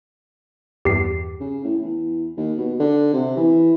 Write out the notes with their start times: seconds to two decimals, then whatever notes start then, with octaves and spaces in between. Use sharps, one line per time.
0.85 E2 G2 G4 C7
1.40 C#3
1.64 A2
1.81 E2
2.37 D#2
2.58 B2
2.80 D3
3.13 C3
3.37 E3